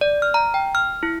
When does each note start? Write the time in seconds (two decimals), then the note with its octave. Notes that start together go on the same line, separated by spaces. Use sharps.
0.01 D5
0.22 F6
0.34 A#5
0.54 G5
0.75 F6
1.03 E4